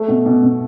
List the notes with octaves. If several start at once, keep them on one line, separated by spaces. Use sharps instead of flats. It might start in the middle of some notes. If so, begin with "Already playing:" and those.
Already playing: A3
B2
B2
B2